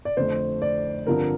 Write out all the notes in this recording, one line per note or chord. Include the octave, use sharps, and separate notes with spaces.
D5
F2 D3 A3 C5
D5
G2 D3 F3 C4 A#4